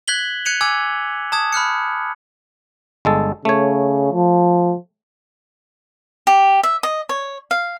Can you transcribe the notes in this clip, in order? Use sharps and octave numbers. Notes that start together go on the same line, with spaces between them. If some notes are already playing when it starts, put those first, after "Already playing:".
F#6 G#6 B6 F#7 G7
F#6 G#6 C#7 D#7 F7
G#5 D6 E6 G#6
A5 D#6 G#6
B5 F6 F#6 C#7
G1 G#3 A4
C#3 A3 C#5
F3
G4
E5
D#5
C#5
F5